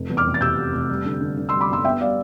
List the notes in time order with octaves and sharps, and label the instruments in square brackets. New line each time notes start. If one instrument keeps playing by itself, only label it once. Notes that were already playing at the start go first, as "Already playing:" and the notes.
Already playing: [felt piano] F1
E2
D6 F6
F1
A6
C3 E6 G6
C3
F1
G3
D3
D3
D3
C6 E6
G3
B5 D6
G1 C6 E6
B3 E5 G5
G3 D5 F5